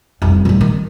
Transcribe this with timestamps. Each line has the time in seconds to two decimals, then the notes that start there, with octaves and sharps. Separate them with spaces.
0.22 F1 C2
0.45 G#2 G3
0.61 D#3